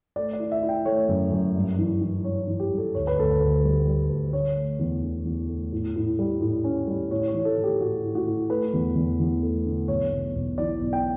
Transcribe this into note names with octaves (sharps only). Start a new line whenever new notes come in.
A3 D5
D5
E4
E5
E4
G5
A3 C#5
F#2
F#2
G2
E3
E3
G2 C#5
E3
G4
G2
A4
D2 C#5
B4
D2 A4
B4
D2
G3
G3
D2
D3 C#5
A3
E2
D3
E2
A3
A2
A2
G3
A2
C#4
G3
A2 C#5
C#5
E3
A4
A2
G4
A2 F#4
A2
F#4
A2
A3 B4
E2
E2
E2
A3
D3
B1 C#5
B1
B1
E3 D5
B1
G5